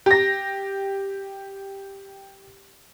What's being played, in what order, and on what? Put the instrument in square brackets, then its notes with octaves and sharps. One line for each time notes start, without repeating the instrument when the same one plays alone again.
[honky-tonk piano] G4 A#6